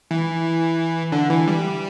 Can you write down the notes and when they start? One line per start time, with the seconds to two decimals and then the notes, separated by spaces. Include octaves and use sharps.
0.11 E3
1.12 D3
1.30 E3
1.48 G3